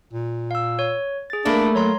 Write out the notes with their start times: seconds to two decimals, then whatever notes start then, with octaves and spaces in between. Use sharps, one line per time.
0.13 A#2
0.51 F5 E6
0.79 C#5
1.30 G#4 A6
1.45 A3 A#3 D4 E4 D5 B5
1.75 F#3 C#5 A#5 C6